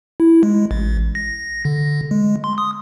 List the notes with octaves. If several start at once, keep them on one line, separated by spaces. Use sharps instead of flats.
E4
G#3
A1
A#6
D3
G#3
C6
D#6